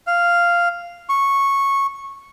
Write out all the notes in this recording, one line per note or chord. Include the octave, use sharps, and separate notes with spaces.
F5
C#6